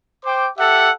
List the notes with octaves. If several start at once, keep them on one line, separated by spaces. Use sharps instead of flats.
C5 G5 D6
G4 A4 E5 F#5